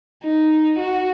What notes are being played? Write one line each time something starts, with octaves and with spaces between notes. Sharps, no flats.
D#4
F#4